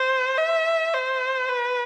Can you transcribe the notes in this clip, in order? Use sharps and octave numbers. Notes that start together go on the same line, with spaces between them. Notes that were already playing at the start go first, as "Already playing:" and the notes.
Already playing: C5
E5
C5
B4